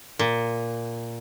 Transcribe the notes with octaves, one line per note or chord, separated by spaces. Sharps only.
A#2